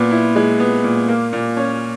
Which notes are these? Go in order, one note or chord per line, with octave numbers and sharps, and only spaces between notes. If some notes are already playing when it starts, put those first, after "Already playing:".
Already playing: A#2 B3
E4
G#3
B3
A#2
A#3
A#2
C#4